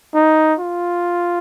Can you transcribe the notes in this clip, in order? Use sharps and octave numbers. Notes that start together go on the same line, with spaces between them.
D#4
F4